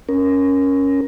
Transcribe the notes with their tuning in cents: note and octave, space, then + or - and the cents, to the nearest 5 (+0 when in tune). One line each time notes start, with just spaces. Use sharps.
C#4 +0 A#4 +10